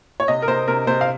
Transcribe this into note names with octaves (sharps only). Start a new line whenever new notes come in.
C#5
C3 D#5
A#4
C3 C5
C3 A#4
C3 C5
F5